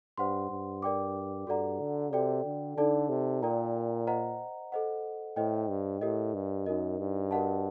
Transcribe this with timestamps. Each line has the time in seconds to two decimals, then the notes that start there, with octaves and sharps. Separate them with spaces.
0.18 G2 C5 F#5 C6
0.50 G2
0.82 A#4 D5 G5 D6
1.47 G2 F#4 A4 D5 F#5 A#5
1.80 D3
2.13 C3 F#4 A4 D5 G5
2.45 D3
2.77 D3 D#4 A4 D5 A5
3.09 C3
3.42 A#2 A#4 D5 G5 A#5
4.07 C5 D#5 F#5 A#5
4.72 A4 C5 D#5 F#5
5.36 A2 C5 D#5 G5
5.69 G2
6.02 A2 G4 A#4 D#5
6.34 G2
6.66 F#2 D#4 F#4 A#4 D#5
6.99 G2
7.31 F#4 A#4 D#5 F#5 A5